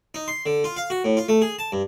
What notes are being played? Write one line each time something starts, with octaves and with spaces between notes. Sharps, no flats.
D#4
C6
D3
F4
F5
F#4
A2
F4
A3
G#4
A5
G2